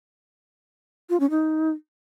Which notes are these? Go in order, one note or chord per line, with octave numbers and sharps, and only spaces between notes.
F4
C#4
D#4